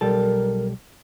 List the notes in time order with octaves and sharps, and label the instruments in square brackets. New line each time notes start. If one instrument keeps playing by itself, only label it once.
[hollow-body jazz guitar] B1 G3 A4 [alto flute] A#4